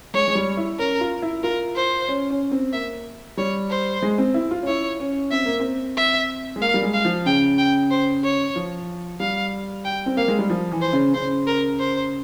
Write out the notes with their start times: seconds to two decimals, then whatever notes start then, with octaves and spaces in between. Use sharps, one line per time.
0.14 G#3 C#5
0.28 G#3
0.35 G3
0.57 E4
0.79 C#4 A#4
1.01 F4
1.22 E4
1.43 F4 A#4
1.76 C5
2.08 C#4
2.30 C#4
2.52 C4
2.73 A#3 E5
3.37 G3 C#5
3.70 C5
4.02 G#3
4.18 C4
4.34 E4
4.51 F4
4.63 C#4
4.67 E4 C#5
5.00 C#4
5.31 C4 E5
5.46 A#3
5.60 C4
5.97 E5
6.56 G#3
6.61 A#3 F5
6.74 G3
6.83 G#3
6.94 F5
7.05 F3
7.26 C#3 G5
7.58 G5
7.91 C5
8.23 C#5
8.56 F3
9.20 G3 F5
9.85 G5
10.06 C4
10.17 A#3 F5
10.28 G#3
10.39 G3
10.50 F3
10.72 E3
10.82 C5
10.93 C#3
11.14 C#3 C5
11.47 A#4
11.79 C5